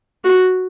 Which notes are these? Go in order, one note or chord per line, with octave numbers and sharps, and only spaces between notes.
F#4